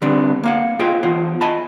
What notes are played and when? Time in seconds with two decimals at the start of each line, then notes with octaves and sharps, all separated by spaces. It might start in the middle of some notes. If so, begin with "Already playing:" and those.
0.02 D3 G3 B3 C4 D4
0.43 A#3 F5 F#5
0.79 F4 G#4 C5 D#5 F5 G5
1.03 E2 F4 C5 F#5
1.41 D#5 G#5 A5 B5